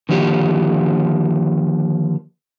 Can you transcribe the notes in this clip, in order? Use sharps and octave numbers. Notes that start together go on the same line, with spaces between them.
D3 D#3 F3 A#3 G4